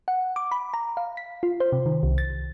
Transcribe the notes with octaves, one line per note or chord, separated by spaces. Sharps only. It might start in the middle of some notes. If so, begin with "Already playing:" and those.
F#5
D6
B5
A#5
F5
B6
F4
C5
C3
D#3
C2
A6